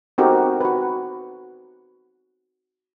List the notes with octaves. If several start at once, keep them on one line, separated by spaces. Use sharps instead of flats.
C4 D#4 F#4 G4 A4 A#4
F#4 B4